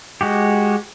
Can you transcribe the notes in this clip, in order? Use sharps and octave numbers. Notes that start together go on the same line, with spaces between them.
G#3 F#4 G4